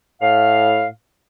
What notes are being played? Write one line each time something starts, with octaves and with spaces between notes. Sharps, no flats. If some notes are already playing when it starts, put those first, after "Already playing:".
A2 F5